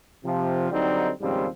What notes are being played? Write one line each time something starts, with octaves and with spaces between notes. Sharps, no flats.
C3 F3
D3 F#3 G3 C4 D#4
D#2 G#2 C#3 F3 G3 C4